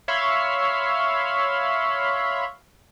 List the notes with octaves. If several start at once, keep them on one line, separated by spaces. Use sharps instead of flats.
C#5 E5 F5 B5 C6